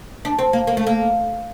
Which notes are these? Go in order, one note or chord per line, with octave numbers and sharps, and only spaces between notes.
D4
C4
A#3
A#3
A3
A#3